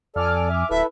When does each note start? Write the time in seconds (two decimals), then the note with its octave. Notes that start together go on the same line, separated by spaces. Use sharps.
0.16 F2 A4 D5 G#5 D6 F6
0.50 E5
0.70 D1 E4 A4 B4 E5